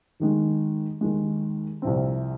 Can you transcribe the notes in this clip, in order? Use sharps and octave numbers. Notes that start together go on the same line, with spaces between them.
D#2 D#3 G#3
D#2 D#3 G#3
C2 C3 F3 C4